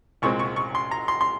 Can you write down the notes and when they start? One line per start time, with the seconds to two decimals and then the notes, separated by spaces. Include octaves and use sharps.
0.22 C2 A#2 G#3 C4 C#6
0.39 C#6
0.56 C#6
0.75 C6
0.91 A#5
1.08 C6
1.21 C6